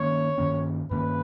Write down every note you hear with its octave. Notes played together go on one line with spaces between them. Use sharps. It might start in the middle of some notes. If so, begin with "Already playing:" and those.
Already playing: G2 D#3 A#3 C#4 C#5
G2 D#3 A#3 C#4
G2 D#3 A#3 C#4 B4